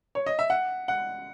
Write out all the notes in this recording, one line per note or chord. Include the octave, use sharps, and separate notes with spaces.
C#5
D#5
E5
F#5
F#5